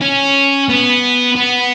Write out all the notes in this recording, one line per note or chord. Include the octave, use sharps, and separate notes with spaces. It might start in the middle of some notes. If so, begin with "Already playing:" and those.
C#4
B3
B3